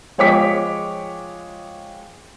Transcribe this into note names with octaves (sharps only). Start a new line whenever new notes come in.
F3 G#3 C#5 G5 D6 B6